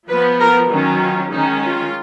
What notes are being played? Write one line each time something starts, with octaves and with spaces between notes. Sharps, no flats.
F3 B3 B4
A#4
D#3 F#3 C#4
F4
D#3 G#3 C#4 D#4
F4